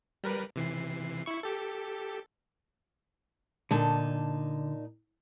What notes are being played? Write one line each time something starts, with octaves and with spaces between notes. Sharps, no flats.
G3 A#4 B4
C3 E3 C7
E4 C#6
G4 A4
A#2 D3 D#4 A5